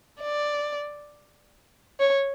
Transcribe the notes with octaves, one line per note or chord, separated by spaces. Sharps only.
D5
C#5